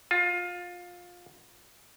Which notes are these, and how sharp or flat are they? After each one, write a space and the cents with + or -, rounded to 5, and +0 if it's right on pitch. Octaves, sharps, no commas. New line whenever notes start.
F4 +20